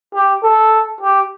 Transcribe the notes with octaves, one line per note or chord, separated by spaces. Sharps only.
G4
A4
G4